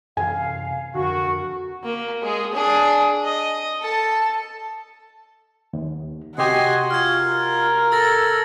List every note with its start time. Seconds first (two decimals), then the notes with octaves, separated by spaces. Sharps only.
0.17 F#2 C3 E3 F5 G#5
0.95 F2 D3 F#4 A#4 C#6
1.84 A#3
2.23 G#3 G#4
2.53 D4 G#4
3.24 D#5
3.81 A4 A5
5.73 D#2
6.38 C3 F#4 G4 D#5 G#5 C6
6.91 F4 F6 G#6
7.24 A#4
7.92 A4 E6 A6 A#6